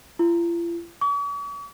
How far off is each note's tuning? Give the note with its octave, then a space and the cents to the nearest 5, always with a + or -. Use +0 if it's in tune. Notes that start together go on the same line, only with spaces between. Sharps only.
F4 -45
C#6 +45